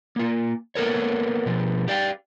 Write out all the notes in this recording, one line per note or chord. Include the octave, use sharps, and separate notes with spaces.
A#3 F4
A#3 B3 A4 A#4 C#5
B2 F3
G4 D5 F5 G5